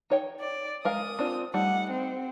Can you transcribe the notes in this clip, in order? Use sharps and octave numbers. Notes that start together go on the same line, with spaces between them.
D#4 C#5 G5
D5
G#3 A#4 F5 D#6
C4 D4 F4
G3 A3 D#4 F#5
C4